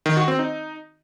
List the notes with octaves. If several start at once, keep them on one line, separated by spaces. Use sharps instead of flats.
D#3
F#4
C4
D#4